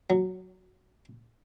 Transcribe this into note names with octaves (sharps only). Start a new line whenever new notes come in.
F#3